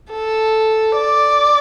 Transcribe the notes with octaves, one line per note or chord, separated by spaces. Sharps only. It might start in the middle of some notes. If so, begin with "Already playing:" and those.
A4
D5